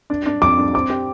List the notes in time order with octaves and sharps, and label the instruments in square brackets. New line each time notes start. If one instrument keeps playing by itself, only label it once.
[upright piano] D4
D4
[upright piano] F2 [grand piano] D6
[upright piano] D4
[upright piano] C4 [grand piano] D6
[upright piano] G4